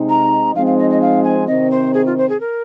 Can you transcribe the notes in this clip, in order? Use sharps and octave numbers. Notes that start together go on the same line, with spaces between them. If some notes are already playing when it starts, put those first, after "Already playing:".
Already playing: C3 G#3 C4 D#4
A#5
F3 G#3 C4 D#4 F5
F5
D#5
D#5
F5
G#5
C3 D#3 C4 D#5
C5
G#4
F4
C5
G#4
A#4